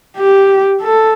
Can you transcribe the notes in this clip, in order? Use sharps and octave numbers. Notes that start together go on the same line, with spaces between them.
G4
A4